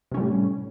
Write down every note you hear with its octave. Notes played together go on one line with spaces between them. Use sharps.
A2 C3 G3 C#4